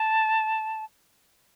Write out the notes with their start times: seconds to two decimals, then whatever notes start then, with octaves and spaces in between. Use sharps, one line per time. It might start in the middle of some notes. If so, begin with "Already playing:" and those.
Already playing: A5